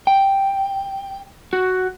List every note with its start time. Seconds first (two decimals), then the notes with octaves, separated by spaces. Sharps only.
0.07 G5
1.53 F#4